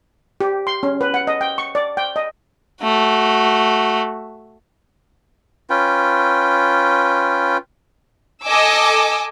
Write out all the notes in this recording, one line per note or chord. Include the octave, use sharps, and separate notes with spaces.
G4
C6
C#4
B4
F#5
D#5
G5
C#6
D5
G5
D#5
A3 F#4
C#4 F4 B4 G5
A4 D#5 G#5 D6 E6